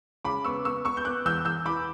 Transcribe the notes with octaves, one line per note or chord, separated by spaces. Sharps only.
C#3 B5 D6
B3 C#6 E6
B3 C#6 E6
B3 C#6 E6
G6
B3 D6 F#6
E2 E6 G6
E2 E6 G6
E3 B5 D6